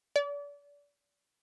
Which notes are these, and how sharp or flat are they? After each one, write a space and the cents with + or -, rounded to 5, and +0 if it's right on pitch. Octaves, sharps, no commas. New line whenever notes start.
D5 -35